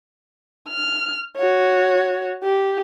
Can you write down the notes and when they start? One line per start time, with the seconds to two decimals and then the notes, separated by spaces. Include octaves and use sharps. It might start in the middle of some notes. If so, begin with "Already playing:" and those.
0.69 F6
1.37 F#4 C#5
2.44 G4